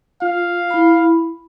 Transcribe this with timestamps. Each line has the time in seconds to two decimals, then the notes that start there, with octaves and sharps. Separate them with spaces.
0.22 F4 F5
0.70 E4 B5